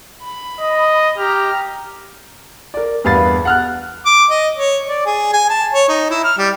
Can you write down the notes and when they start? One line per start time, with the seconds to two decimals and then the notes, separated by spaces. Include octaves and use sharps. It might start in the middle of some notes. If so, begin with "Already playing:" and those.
0.23 B5
0.60 D#5
1.18 G4 A#5 F6
2.74 A#4 D5
3.04 E2 G2 B3 F5 B5 A6
3.45 F#5 F6 F#6
4.05 D6
4.30 D#5
4.57 C#5
4.88 D5
5.05 G#4
5.33 G#5
5.50 A5
5.73 C#5
5.88 D#4
6.10 E4
6.24 F6
6.38 G3